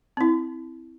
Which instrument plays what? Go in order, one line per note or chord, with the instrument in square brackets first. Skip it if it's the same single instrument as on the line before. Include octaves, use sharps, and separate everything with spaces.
[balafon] C4 E4